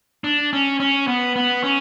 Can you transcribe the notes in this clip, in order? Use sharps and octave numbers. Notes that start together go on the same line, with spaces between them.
D4
C#4
C#4
B3
B3
C#4